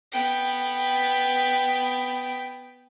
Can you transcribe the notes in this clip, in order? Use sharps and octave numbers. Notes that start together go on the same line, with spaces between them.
B3 G5